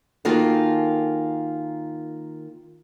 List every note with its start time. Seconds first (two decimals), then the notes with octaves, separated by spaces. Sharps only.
0.25 D#3 A#3 F4 F#4 G#4 A4